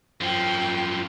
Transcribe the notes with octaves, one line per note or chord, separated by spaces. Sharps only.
F#2 F3 G5